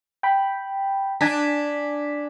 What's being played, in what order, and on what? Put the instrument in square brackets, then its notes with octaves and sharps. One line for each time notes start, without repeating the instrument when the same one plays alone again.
[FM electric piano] G5 B5
[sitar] D4 [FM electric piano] G#5 B6